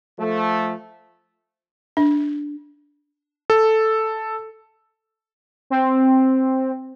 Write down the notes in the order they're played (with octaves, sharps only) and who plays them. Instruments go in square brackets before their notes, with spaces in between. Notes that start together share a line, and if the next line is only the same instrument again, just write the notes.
[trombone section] F3 A3
[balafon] D4
[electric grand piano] A4
[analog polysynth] C4